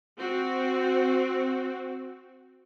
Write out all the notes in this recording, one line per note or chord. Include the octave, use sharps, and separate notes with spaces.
C4 F#4